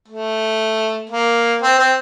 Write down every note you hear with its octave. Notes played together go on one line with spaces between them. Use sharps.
A3
A#3
C4
C4